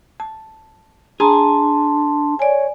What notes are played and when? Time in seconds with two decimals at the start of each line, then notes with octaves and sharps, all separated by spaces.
0.20 A5
1.20 D4 G#4 A5 A#5 C6
2.39 C#5 D5 G#5